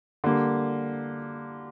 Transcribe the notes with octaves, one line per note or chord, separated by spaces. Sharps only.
D3 G3 A#3